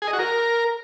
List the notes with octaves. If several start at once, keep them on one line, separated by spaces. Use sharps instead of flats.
G#4
D#5
F#4
A#4